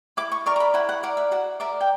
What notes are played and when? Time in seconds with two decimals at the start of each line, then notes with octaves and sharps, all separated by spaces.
0.17 E4 D6
0.32 C#6
0.46 A#4 D5 C#6
0.56 A#5
0.60 B5
0.74 E4 F#5
0.89 F#5
1.03 A#4 D5 F#5
1.17 E5
1.31 F#4 F#5
1.60 A#4 D5 E5
1.81 G5